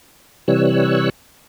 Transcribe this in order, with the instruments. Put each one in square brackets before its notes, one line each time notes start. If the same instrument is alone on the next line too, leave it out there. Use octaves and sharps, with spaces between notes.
[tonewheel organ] C3 E3 G3 C#5 E6 F#6